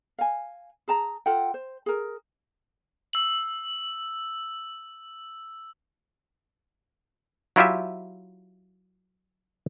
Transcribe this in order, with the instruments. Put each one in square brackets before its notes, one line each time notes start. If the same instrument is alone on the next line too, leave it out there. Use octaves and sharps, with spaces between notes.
[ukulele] F5 G#5
G#4 A5 A#5
F4 A4 F#5 G5
C5
G#4 A#4
[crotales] E6 F#7
[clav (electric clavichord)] F#3 E4 F4 G4 E5